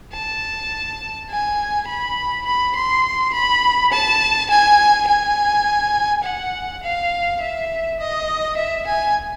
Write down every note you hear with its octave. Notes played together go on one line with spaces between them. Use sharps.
A5
G#5
B5
B5
C6
B5
A5
G#5
G#5
F#5
F5
E5
D#5
E5
G#5